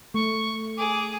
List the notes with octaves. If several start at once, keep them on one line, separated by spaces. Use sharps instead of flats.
A3 C#6
G#4 D6